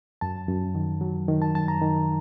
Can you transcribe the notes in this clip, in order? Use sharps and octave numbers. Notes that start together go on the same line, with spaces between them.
F#2 A5
F#2
D#3
F#3
D#3
A5
F#2 A5
A#5
D#3